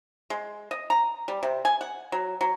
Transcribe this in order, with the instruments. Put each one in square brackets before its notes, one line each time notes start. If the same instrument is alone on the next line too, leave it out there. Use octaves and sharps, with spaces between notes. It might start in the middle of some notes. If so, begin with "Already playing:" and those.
[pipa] G#3
D#5
A#5
G3
C3
G#5
F#5
F#3
F#3